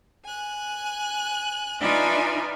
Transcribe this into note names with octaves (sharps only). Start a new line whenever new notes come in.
G#5 F#6
D4 D#4 F4 B4 E5 G#5